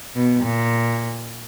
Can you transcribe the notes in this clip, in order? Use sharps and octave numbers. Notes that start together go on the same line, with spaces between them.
B2
A#2